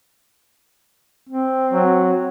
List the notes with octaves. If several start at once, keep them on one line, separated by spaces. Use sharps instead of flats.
C4
F#3